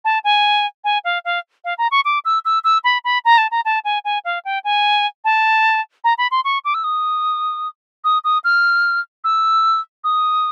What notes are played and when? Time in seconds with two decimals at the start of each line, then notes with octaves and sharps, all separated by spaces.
0.05 A5
0.24 G#5
0.84 G#5
1.05 F5
1.25 F5
1.65 F5
1.78 A#5
1.91 C#6
2.05 D6
2.25 E6
2.45 E6
2.64 E6
2.84 B5
3.05 B5
3.25 A#5
3.38 A5
3.51 A#5
3.65 A5
3.85 G#5
4.05 G#5
4.25 F5
4.45 G5
4.64 G#5
5.25 A5
6.04 A#5
6.18 B5
6.31 C6
6.45 C#6
6.65 D6
6.74 E6
6.84 D#6
8.04 D#6
8.24 D#6
8.44 F6
9.24 E6
10.04 D#6